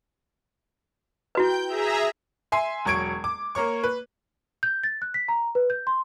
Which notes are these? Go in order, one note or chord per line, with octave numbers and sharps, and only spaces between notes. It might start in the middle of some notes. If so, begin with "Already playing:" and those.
E4 F#4 B4 G5 G6
G#4 E5 A#5
E5 G#5 C6 C7
E1 F#3 C#6 G#6 D7
D6
A#3 A#4 C#5 C#6
B4
G6
A6
F#6
B6
A#5
B4
G6
C6